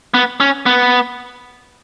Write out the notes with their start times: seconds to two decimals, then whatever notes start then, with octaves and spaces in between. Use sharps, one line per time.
0.14 B3
0.40 C#4
0.66 B3